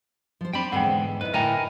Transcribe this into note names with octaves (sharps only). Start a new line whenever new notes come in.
F3 C5
C4 D4 D5 G5 B5
E2 G#2 D3 G#3 F#5 G5
D#4 E4 B4 C5 D#5
A2 D3 E4 A#4 E5 G5 G#5 A#5